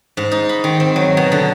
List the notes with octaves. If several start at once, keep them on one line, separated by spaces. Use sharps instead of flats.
G#2
D#4
B5
D#3
C4
F#3
B2
D3